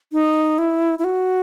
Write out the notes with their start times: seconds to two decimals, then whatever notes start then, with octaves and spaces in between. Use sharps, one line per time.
0.13 D#4
0.58 E4
0.99 E4
1.04 F#4